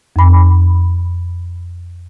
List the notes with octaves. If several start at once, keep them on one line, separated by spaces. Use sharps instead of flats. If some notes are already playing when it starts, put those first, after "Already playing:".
F2 B5